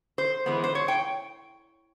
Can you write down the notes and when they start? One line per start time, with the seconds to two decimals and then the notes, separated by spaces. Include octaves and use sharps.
0.18 C5
0.46 E3 G#3 B3
0.64 C5
0.75 C#5
0.88 G5